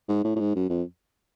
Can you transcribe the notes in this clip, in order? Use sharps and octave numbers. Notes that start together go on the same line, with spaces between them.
G#2
A2
A2
G#2
F#2
F2